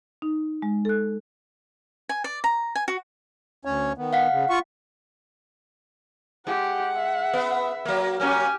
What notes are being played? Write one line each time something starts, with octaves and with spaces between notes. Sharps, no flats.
D#4
G#3
A4 F#6
G#5
D5
A#5
G#5
F#4
D2 C#4 C#5
D#3 B3
F5 F#5 B6
C#3
F4 C#6
G#3 G4 F#5
E5
B3
F#3 A#3
F#3 A#3 C#4 G4 G#5 F6